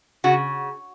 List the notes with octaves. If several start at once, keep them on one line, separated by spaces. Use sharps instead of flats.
C#3 F#4